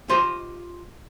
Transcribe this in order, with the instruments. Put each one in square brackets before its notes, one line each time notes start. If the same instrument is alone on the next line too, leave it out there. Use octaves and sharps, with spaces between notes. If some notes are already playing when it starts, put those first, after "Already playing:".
[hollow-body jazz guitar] F4 G4 C5 D#5 C6